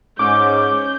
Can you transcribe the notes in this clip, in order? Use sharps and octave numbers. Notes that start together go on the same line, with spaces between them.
G#2 C#4 D6 G6